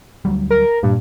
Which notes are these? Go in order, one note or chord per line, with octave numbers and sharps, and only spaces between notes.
D2 F#3 G3
A#4
G2 A#2